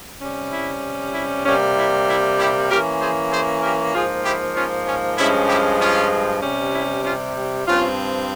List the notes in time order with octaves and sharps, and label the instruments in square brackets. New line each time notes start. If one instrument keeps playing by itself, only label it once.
[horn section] C3 G3 C#4
E4
E4
C3 G3 A#3 C#4
E4
E4
E4 G4
E3 A#3 C#4 G4 A#4
G#4 C5
G#4 C5
G4 A#4
G#2 F3 A#3 F4 G#4
E4 G4
C#4 F4
C#4
G2 F3 G#3 C#4 E4
E4 G4
C#4 F4
C3 G3 C#4
E4
C#4 F4
G2 F3 C4 C#4 F4